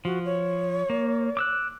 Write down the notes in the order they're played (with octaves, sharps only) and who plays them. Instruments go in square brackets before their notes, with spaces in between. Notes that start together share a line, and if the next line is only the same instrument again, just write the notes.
[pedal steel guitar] F3 [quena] F#4
[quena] C#5
[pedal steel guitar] A#3
D6 E6 F#6